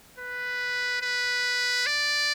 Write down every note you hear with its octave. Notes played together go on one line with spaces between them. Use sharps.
B4
B4
D5